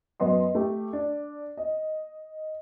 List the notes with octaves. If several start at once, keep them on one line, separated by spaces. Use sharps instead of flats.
F#2 B3 D#5 C6
A3 G4
D4
D#5